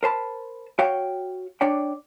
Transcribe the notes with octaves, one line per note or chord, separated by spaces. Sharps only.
A#4 C5 A5 B5
F#4 C#5 F5 G5
D4 C#5 D5 G5